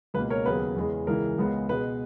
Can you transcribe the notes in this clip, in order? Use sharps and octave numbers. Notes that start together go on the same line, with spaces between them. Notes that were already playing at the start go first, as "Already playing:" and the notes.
C#2 B2 A#3 B4
A#4 C#5
D#2 C#3 F#3 B3 B4
E2 C#3 G#3 B3
C#2 C#3 E3 A#4
C#2 C#3 G#3 B3
B2 G#3 B3 B4